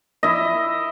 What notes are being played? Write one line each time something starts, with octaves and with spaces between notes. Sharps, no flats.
E4 D#5